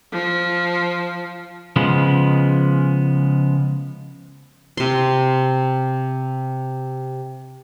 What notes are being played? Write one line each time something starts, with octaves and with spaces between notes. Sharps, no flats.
F3
C#3 F3 G#3 B3
C3 C6